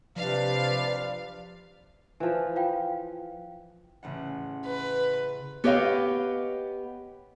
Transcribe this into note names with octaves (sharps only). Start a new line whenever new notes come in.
C3 F3 D4 B4 D5 F5
E3 F3
F4 F5 G5
A1 C#3 F#5
B4
B3 G4 C#5 D#5 F5